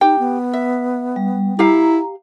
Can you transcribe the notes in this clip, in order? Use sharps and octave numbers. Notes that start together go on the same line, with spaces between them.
D#4 G4 G5
B3
E5
G3
E4 G4 F5 A#5